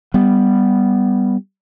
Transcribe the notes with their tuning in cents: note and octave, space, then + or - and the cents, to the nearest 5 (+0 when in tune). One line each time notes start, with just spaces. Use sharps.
G3 +5 B3 +0